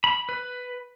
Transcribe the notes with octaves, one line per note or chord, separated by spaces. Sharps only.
B5
B4